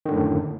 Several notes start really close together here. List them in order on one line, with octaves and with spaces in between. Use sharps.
D#3 D3 A2 F#2